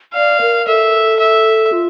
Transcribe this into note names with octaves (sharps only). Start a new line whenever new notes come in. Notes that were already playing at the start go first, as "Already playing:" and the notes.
D5 F5
A#4
A4 E5
E5
F4